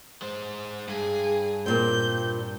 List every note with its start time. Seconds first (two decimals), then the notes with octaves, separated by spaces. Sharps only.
0.22 G#3 C5
0.88 G2 G#4
1.66 A#2 C4 G6